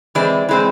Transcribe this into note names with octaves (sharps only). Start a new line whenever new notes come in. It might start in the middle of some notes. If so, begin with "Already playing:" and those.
E3 G#3 C4 D5
E3 G#3 C4